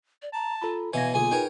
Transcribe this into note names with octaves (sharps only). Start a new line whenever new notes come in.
D5
A5 A#5
F4 A4 A#5 B5
B2 E3 C#5 F5 G#5 G#6 A#6
B1 D3 A#3 F4 G#4 G#5
D#4 G#4 A#4 B4 C#5 G5